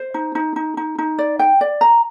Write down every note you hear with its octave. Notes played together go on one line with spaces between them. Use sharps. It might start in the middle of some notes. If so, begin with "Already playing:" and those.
Already playing: C5
D#4
D#4
D#4
D#4
D#4
D5
G5
D5
A#5